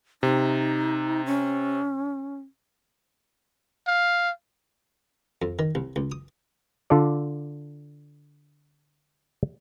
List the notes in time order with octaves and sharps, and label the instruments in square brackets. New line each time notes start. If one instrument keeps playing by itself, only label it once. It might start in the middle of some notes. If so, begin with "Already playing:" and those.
[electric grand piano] C3 [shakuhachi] D#4
[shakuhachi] C#4
[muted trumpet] F5
[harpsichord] F2
D#3
C2
C#2
D#6
[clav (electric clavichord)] D3 F4 A4 D5